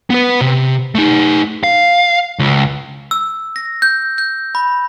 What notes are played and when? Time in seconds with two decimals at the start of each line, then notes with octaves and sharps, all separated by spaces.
0.10 B3 B4
0.41 C3
0.95 A3 D#4
1.64 F5
2.39 C#2
3.11 E6
3.56 A#6
3.82 G6
4.18 G6
4.55 B5